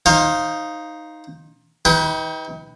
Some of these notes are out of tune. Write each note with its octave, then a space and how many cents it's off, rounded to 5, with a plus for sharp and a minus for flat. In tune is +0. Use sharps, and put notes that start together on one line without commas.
D#4 +0 C5 +25 F5 +0
D#4 +40 G4 +0 B4 +0